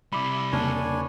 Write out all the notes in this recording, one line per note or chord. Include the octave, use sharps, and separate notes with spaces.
C3 G3 E4 B5 D6
E2 C#3 A#3 D4 C#5 G#5